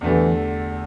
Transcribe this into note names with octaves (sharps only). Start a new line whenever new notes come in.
E2 D3 E3 A3 G4